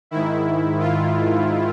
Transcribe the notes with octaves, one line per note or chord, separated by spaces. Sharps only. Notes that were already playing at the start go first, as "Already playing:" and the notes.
G#2 D#3 E4
F4